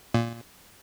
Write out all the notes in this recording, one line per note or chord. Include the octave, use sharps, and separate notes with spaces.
A#2